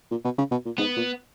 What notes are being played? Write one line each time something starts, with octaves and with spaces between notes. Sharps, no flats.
A#2
B2
C#3
B2
A#2
G#2 B3
A#2